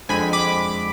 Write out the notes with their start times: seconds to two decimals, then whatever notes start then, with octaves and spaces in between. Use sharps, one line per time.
0.09 F2 D3 G#3 C4 G#5 B5
0.33 B5 D6